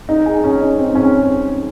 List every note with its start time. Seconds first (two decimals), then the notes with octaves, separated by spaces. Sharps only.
0.09 D#4
0.26 G#4
0.44 C#4
0.61 D#4
0.78 C4
0.95 C#4